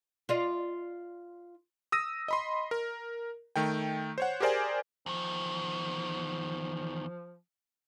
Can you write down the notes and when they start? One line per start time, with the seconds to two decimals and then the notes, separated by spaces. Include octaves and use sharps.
0.29 F4 D5 D#5
1.92 D#6 E6 A#6 D#7
2.28 D#5 B5 C6
2.71 A#4
3.56 D#3 A3 G5
4.18 C5 C#5 F#5
4.40 G4 G#4 A#4 C5 D5 G#5
5.06 E2 D#3 F3